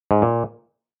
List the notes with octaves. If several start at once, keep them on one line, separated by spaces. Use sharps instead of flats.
G#2
A#2